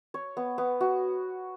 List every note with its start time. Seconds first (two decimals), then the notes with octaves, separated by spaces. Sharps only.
0.14 C#5
0.37 B3
0.58 B3
0.81 F#4